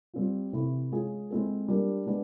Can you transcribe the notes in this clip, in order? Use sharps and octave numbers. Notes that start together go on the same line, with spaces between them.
G3 C4 F4
C3 E3 A3 C4 E4
G#3 C#4 F4 G#4
G#3 C4 E4 A4
G3 A#3 D4 G4
G#3 B3 D4